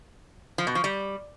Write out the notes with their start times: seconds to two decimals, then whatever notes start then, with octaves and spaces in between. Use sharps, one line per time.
0.58 F3
0.67 B2
0.75 F3
0.84 G3